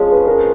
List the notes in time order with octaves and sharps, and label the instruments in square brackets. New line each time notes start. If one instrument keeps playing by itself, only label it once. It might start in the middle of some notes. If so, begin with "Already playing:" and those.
Already playing: [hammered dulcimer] F3 G#3 C#4 [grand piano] C#5 D#5
[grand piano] B4
A#4